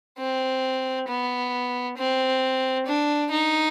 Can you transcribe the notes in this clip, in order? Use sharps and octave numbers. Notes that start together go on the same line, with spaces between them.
C4
B3
C4
D4
D#4